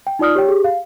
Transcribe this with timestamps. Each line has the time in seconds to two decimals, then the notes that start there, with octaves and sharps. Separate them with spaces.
0.07 G5
0.19 D#4 F4 D5 D#6 F6
0.35 G4 C#5 G5
0.48 G4 G#4
0.64 F5